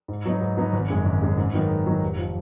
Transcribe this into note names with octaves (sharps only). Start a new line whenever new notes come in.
G#2
F#3 B3 D#4
G#2
F#3 B3 D#4
G#1
F#2 C#3 G#3
G#1
F#2 C#3 G#3
G#2
D#3 F#3 B3 D#4
G#2
D#3 F#3 B3 D#4
F1
F3